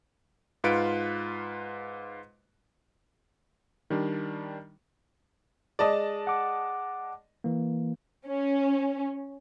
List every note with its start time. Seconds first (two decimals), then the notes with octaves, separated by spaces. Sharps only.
0.64 G#2 F4 B4 C#7 D7
3.90 D#3 G3 D4
5.79 G#3 D5 D#5 A5
6.27 F#5 D6
7.44 E3 A#3
8.27 C#4